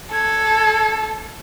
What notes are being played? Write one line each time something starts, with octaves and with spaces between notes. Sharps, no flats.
A4 G#6